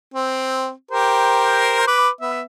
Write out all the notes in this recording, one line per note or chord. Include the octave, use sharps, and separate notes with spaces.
C4
G4 A#4 C5
B4 D6
B3 E5